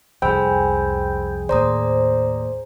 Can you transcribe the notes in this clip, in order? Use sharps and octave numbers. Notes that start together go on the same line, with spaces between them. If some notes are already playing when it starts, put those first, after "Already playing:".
C2 F2 G#3 G#4 C5 G5 B5 E6
D#2 A2 C5 D5 A#5 D#6